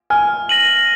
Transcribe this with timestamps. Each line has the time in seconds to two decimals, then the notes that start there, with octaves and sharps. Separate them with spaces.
0.10 G#5 F6
0.49 A#6 D#7 F#7